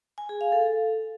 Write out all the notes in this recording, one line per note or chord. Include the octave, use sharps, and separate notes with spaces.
G#5
G#4
F5
A4